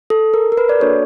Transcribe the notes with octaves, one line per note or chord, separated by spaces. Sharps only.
A4
A#4
A#4
B4
D5
A#3 D4 F#4 A4 C#5